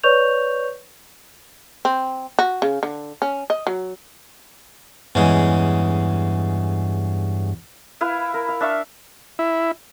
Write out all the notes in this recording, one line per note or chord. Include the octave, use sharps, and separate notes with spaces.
B4 C#5 D5 C#6 G6 F7
C4
F#4
C#3
D3
C#4
D#5
F#3
E2 G2 C#3 G#3
E4 B4 F5
A#4
F5
D4 E5 F5 C#6
E4